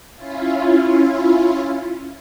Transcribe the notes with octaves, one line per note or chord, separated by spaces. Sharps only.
C#4 E4 F4